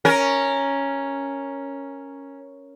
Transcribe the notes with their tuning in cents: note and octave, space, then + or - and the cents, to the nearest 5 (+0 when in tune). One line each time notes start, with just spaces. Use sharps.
C#4 +0 A#4 +0